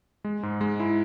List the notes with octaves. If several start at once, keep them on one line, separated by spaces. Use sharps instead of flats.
G#3
G#2
G#3
E4